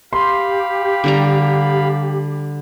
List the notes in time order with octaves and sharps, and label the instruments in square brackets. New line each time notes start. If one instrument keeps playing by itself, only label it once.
[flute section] G4 [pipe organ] F5 B5 [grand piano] C6
[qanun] D3 G3 A#5